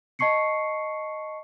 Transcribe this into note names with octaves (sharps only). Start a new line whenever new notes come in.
D#5 A5 C#6 C7 C#7